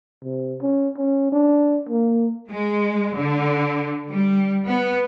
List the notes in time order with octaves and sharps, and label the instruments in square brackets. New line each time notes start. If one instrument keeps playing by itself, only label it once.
[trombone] C3
C#4
C#4
D4
A#3
[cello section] G#3
D3
G3
B3